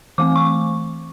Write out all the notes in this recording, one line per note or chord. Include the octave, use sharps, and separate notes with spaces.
E3 A3 C4 D6
C#6